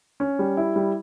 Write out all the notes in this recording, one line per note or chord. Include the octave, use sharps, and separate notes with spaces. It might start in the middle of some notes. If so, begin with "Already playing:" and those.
C#4
G3
E4
G3